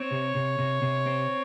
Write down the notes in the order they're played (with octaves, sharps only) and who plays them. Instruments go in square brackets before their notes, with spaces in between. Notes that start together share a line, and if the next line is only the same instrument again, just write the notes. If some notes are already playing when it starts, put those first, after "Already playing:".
Already playing: [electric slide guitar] C4 [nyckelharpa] C#5
[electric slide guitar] C3
C3
C3
C3
C4